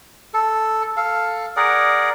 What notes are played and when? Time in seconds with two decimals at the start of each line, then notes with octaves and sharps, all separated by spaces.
0.34 A4
0.97 A4 F5
1.56 G#4 A#4 D5 F#5